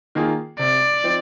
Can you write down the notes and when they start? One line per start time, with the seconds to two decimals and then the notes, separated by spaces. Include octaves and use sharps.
0.15 D#3 A#3 F4 G#4
0.59 C3 D5
1.03 F3 C4 D#4